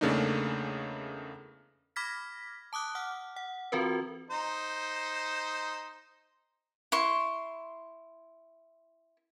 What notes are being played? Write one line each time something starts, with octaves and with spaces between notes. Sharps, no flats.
E2 C#3 A3 A#3 D4 D#4
B5 D6 F6 G#6 A#6 B6
A5 D6 D#6 F#6
F#5 D6 F6
F#5
E3 C4 F4 F#4 A#4 B4
D#4 C5
E4 C6 C#6